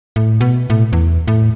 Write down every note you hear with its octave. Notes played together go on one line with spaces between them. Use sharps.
A2
B2
A2
E2
A2